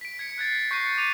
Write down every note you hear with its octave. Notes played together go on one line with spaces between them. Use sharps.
B6 D7
G#6 B6 C#7
F#6 G#6 A6 C7
C#6 G6 A#6 C7 C#7 D#7
D6 D#7 F7